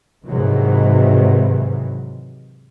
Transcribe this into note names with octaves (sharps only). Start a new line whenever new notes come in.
G#2 C3 D#3 E3 F#3